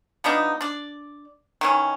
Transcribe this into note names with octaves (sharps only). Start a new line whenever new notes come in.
F3 B3 D4 D#4
D4 D5
D#3 E3 C#4